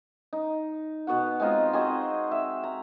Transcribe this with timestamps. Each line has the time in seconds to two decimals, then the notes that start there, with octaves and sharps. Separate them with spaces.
0.33 D#4
1.07 B2 B3 F#4 F#5
1.40 G#3 C4 D#4 F4
1.73 C4 F#4 G#4 D#5
2.31 E5
2.64 A#5